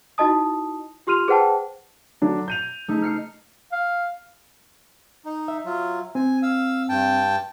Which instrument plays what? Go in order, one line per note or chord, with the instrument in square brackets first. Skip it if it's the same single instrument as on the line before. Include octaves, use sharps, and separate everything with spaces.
[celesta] D#4 E4 F#4 D#5 A5 D#6
F4 G4 C6 F6 D#7 F7
G#4 B4 C5 F#5 G5 A5
[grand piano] D3 F#3 D4
G6 D#7 F7
[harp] A3 D#4
F6 C7 C#7
[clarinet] F5
[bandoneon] D#4
[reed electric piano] E5
[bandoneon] F#3 F4
[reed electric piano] C4 [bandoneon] G#5
[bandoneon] F5 E6
G2 G5 A5